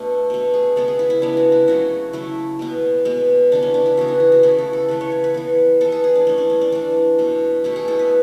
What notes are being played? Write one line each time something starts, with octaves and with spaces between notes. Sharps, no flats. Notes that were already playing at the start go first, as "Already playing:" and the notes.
Already playing: B2 A3 D4
B2 A3
G#4
C#3 G#3 B3 A4
G#4
E4
E4
C#3 G#3 B3 D4
F#4
E4
C#3 F#3 A3 F#4
C#3 F#3 A3 E4
B2 G#3 B3
B2 G#3 B3
C#3 E3 B3 D4
C#4
D4
E4
C#3 E3 B3 F#4
G#4
G#4
F#4
C#3 E3 A3 E4
A4
A4
C#3 E3 A3 B4
C#5
C#5
B4
E3 B3
E3 B3 A4
G#4
G#4
D4
E3 A3 C#4
D4
C#4
D4
E3 A3 D4
B2 A3
B2 A3 E4
G#4
A4
B4